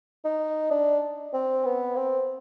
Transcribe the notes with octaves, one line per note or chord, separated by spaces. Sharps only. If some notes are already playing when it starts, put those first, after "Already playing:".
D#4
D4
C4
B3
C4